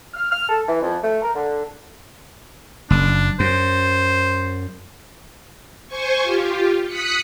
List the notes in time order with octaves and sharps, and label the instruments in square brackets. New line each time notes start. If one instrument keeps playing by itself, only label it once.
[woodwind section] F6
F6
A4
E3
F2
A3
A#4
D3
[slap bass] F#1 [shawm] D4
[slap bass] F#2 [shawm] C5
[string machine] C5 G#5 C#6
F4 G4
D#6 F#6 B6 C#7